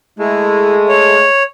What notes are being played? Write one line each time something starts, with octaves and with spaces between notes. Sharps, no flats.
G#3 A3 E4
C#5